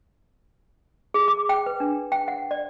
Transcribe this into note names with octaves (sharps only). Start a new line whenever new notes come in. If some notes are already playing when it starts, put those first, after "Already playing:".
G#4
D6
G5
B4
D4
G5
F#5
D5